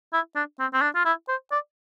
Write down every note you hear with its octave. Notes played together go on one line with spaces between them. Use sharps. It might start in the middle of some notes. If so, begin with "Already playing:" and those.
E4
D4
C4
C4
D4
F4
E4
C5
D5